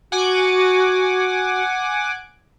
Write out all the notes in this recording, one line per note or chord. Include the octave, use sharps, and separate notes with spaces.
F#4 F#5 G#5 D6